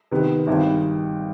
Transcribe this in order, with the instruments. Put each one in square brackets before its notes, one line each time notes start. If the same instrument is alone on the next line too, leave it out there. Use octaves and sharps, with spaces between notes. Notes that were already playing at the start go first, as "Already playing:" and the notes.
[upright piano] C3 D#3 B3
G#1 G2 D#3